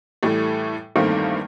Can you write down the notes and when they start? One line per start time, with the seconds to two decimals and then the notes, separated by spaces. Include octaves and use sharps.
0.23 A2 E3 G3 A3
0.96 E2 G2 D#3 A3 A#3 C4